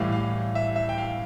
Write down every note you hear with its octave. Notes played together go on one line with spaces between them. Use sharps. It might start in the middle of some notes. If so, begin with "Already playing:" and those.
Already playing: A2 E3 G3 F5
F5
E5
E5
G5
F5